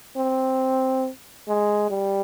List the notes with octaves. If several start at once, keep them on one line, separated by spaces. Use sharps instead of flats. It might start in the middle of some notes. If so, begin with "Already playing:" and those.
C4
G#3
G3